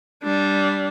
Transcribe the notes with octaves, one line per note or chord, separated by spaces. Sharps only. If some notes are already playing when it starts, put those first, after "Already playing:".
G3 D4